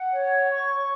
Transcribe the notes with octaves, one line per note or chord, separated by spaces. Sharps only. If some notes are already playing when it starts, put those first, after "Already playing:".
Already playing: F#5
C#5
C#6